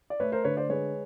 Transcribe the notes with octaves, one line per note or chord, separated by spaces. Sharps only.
D5
A3 B4 C#5
A#4 C5
D3 B4 C#5
C5 D5
G#3 B4 C#5